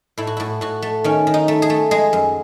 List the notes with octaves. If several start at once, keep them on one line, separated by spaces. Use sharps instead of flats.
A2 E4
F#4
A2 E4
A2 F#4
A3
D#3 C#4
D#3
D#4
A3
G#4
A3
G#3 G#4
F#2